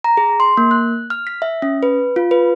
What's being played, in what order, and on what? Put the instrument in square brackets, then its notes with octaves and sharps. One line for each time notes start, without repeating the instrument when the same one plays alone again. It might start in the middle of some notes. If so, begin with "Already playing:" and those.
[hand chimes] A#5
G#4
C6
A#3
F#6
F6
B6
E5
C#4
B4
F4
B4